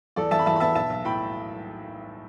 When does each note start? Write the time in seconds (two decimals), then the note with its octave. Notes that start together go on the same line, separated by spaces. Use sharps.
0.16 E2 A4 D5
0.31 E2 E5 A5
0.39 B5
0.46 E2 E5 A5
0.56 B5
0.60 B3 E5 A5
0.75 B1 E5 A5
0.90 B1
1.04 A2 G5 B5